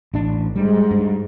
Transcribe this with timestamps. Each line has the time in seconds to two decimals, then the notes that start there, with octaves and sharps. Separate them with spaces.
0.14 A1 D4
0.56 G#2 G3
0.91 G2